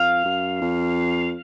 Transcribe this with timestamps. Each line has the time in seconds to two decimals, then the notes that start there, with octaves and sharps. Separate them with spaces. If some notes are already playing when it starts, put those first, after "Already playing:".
Already playing: F2 F5
0.25 F#2
0.61 F2